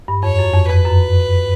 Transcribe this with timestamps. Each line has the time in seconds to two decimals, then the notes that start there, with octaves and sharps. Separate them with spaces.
0.08 G2
0.23 F2 C#5
0.39 F#2
0.54 F2
0.69 F2 B4
0.85 F#2